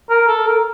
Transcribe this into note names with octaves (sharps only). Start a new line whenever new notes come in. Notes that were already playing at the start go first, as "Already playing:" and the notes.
A#4
A4
A#4